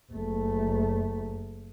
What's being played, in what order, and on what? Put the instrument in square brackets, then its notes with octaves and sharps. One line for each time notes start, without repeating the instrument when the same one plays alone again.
[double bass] F#1 A3